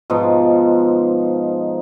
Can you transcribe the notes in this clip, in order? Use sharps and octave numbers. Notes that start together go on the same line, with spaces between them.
G#2 B2 F3 D#4